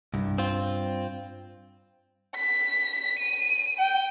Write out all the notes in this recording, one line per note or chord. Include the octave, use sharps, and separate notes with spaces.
C2 G2
C4 F4
B6
D#7
G5